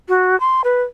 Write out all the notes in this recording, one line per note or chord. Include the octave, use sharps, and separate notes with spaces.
F#4
C6
B4